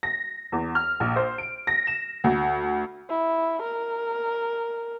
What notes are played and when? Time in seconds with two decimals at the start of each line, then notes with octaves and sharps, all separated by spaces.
0.03 A#6
0.52 E2
0.75 F6
1.00 A#1
1.16 C5
1.38 D7
1.67 A#6
1.87 E7
2.24 D2
3.09 E4
3.62 A#4